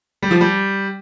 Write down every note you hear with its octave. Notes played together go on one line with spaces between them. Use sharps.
G3
F3
G3